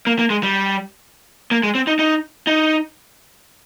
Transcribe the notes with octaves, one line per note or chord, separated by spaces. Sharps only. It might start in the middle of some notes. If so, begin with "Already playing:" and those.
A#3
A#3
G#3
G3
A#3
G#3
C4
D#4
D#4
D#4